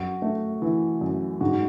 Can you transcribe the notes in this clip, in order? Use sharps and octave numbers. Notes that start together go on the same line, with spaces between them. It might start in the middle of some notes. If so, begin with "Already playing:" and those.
Already playing: F#2 F#4
A3
E3
F#2
G#2 F#4